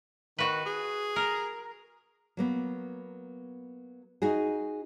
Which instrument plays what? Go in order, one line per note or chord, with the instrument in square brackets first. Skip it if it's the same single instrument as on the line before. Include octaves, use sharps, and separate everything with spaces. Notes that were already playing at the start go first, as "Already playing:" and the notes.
[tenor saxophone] D#3 [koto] F#4 B4
[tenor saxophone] G#4
[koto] A#4
[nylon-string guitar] F#3 A#3 B3
D#4 F#4 G#4